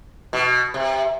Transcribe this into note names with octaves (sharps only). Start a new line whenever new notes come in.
B2
C3